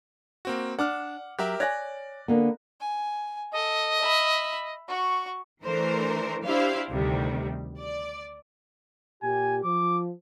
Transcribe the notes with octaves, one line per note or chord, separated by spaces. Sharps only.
A#3 C4 F#4
D4 F#5 D6 F6
F#3 G4 A#4 E5
C#5 D5 G#5 F#6 A#6
D3 A#3 B3
G#5
A4 D#5
E5 B5
F#4 C#6
E3 A3 D4 A#4 C5
D4 E4 G4 C5 F5
D2 C3 D#3 G3
D5
A#2 G4 G#5
F3 D6